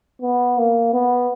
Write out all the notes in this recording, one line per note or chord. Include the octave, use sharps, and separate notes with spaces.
B3
A#3
B3